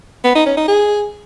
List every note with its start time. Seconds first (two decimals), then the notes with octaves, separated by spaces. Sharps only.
0.24 B3
0.35 D#4
0.46 C#4
0.57 D#4
0.68 G#4